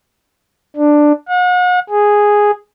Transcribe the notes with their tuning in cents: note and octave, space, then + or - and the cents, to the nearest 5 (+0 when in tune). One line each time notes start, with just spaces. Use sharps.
D4 +10
F#5 -40
G#4 -5